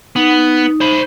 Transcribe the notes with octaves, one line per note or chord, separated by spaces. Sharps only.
B3 D#4
C5 B5